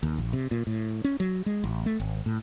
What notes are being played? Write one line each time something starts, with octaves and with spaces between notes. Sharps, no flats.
D#2
A#1
C3
A#2
A2
C#4
F#3
G#3
A1
A3
G#1
A2